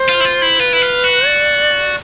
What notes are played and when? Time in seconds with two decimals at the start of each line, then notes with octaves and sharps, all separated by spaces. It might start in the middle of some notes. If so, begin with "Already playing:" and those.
Already playing: C5
0.09 F4
0.20 E4
0.25 F4
0.42 E4
0.59 F4 B4
0.73 E4
0.82 F4
1.04 F#4
1.27 D5